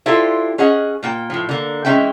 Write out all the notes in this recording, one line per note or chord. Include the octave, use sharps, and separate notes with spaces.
D4 E4 F4 G4 A4 C5
C#4 G#4 D#5 F#5
A#2 A#3 G5
A2 F3
D3 A#3
E3 G#3 C4 C#4 E5 G5